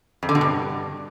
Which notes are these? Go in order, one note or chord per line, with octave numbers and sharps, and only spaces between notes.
F2
D3
B2
G2